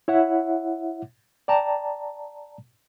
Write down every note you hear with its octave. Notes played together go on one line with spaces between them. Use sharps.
E4 C#5 E5 F#5
D5 G5 A5 A#5